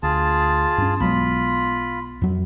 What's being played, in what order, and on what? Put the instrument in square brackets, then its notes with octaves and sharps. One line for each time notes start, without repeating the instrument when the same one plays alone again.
[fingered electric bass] D2 [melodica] F4 G#4 A5
[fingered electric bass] G2 C#4
[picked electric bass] B1 F#3 G#3 [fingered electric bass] B3 [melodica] F4 B5
[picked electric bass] F2 F#3